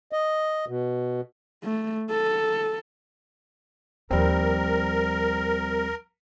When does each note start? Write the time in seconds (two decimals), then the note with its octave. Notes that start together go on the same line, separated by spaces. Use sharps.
0.12 D#5
0.68 B2
1.64 A3
2.10 A4
4.11 D#2 F3 G3 C4 A#4